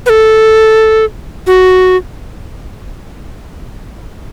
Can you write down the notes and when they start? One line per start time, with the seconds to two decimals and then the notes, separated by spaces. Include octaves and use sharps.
0.06 B4
0.09 A4
1.47 F#4